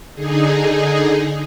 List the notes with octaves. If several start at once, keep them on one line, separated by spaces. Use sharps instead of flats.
D3 D#4 G#4